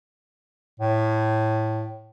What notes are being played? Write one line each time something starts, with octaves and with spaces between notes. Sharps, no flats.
A2